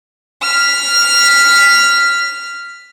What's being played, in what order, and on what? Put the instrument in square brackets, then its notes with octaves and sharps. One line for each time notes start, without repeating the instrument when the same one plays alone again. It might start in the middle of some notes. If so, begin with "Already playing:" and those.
[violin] F6 B6